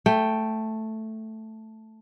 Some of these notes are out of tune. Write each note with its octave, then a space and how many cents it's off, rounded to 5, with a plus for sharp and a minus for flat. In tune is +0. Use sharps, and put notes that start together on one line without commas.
A3 +0 G5 +5